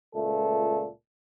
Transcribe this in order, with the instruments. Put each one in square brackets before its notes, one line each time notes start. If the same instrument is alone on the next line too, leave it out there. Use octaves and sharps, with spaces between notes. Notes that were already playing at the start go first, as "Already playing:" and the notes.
[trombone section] C#2 A#2 A3 A4